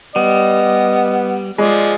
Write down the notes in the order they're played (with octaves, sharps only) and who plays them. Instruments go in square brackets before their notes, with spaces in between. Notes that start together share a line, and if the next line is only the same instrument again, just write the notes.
[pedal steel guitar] G3 [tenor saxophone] B3 [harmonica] D#5
[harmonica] F3 D5 [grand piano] G#3